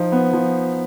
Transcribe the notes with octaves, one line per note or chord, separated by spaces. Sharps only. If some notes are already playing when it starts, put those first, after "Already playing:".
Already playing: F3 D#4
B3
F3